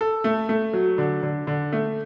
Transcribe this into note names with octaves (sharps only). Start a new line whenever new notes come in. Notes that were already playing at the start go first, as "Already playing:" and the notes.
A4
A3
A3
F#3
D3
D3
D3
A3